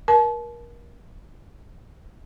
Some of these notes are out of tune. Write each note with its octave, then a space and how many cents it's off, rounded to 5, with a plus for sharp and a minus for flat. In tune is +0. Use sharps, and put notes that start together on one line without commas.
A#4 +30 A5 -35